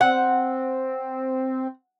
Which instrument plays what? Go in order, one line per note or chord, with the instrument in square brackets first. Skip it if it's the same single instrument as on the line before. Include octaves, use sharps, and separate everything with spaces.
[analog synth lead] C4 [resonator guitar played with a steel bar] F#5